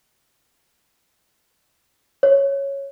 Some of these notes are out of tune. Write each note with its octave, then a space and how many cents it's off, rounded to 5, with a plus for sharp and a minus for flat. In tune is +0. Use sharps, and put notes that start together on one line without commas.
C#5 -5